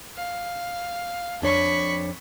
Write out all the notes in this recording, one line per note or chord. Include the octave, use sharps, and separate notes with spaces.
F5
F2 D4 C#5 B5 C#6